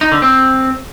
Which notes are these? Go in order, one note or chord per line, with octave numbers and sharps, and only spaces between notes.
D#4
D3
C4